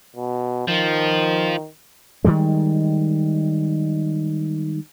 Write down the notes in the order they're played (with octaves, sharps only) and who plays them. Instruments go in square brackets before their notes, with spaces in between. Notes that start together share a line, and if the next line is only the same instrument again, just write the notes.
[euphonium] B2
[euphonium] D#3 [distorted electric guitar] F3
[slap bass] D#3 E3 G3 G#3